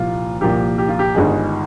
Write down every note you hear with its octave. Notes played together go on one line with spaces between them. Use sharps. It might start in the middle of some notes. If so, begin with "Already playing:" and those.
Already playing: C2 A#2 F3 A#3 F4
C2 A#2 F3 A#3 G4
G4
F4
G4
G1 G2 D#3 G#3 D#4 G#4